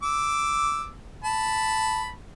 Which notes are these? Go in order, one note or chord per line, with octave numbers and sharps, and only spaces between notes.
D6 E6
A5 B5